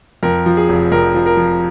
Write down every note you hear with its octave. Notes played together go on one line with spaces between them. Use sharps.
F2 A#4
F3
G#4
F1
F2 A#4
F3
A#4
F3